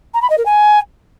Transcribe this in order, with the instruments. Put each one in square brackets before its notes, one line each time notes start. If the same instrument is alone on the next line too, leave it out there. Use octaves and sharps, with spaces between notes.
[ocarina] A#5
B5
D#5
A#4
G#5